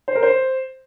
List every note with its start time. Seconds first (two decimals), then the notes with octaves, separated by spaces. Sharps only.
0.08 C5
0.16 A#4
0.23 C5